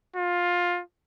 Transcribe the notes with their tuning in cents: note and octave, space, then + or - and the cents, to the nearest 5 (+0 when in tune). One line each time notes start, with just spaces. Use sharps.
F4 +15